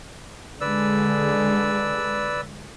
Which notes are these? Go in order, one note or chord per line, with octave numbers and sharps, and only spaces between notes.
D3 G#3 B4 D5 E6